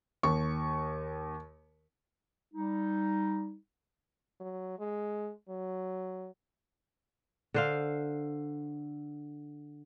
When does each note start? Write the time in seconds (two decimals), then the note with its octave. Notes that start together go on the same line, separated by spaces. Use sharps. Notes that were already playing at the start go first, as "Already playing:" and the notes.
0.23 D#2 C#6
2.53 G3 D#4
4.40 F#3
4.79 G#3
5.49 F#3
7.54 D3 C5 F5